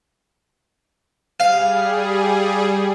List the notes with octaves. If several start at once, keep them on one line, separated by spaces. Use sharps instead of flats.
G3 G#4 F5